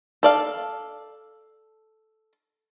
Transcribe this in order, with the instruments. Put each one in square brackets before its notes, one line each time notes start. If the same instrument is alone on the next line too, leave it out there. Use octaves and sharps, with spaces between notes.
[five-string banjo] A4 D5 F5